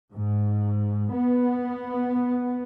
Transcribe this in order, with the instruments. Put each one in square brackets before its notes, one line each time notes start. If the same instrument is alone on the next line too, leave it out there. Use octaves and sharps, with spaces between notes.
[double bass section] G#2
B3